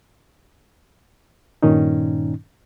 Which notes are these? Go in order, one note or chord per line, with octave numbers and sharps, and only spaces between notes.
G2 A#2 D#3 C#4 D#4